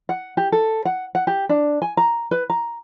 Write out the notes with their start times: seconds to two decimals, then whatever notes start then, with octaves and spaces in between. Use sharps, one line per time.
0.09 F#5
0.37 G4
0.52 A4
0.85 F#5
1.15 F#5
1.27 G4
1.49 D4
1.82 G#5
1.97 A#5
2.31 B4
2.50 A#5